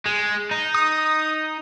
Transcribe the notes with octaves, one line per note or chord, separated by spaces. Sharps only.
G#3
D#4
D#6